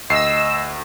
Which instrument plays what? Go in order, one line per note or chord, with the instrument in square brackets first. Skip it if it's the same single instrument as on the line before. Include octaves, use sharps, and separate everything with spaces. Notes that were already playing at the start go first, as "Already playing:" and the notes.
[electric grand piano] D2 C7 [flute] D#5 [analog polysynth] E6